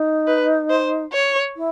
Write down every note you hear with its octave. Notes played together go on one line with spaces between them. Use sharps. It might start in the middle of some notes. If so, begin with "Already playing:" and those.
Already playing: D#4
B4
C5
C#5
E4